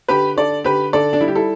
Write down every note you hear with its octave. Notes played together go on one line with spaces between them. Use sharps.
D3 G4 B4
D3 A4 D5
D3 G4 B4
D3 A4 D5
D4
G3 E4
G4
E4 A4